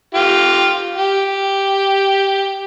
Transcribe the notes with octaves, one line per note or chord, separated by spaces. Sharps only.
F4 G4
G4